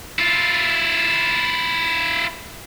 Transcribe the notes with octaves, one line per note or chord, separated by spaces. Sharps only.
E4 F4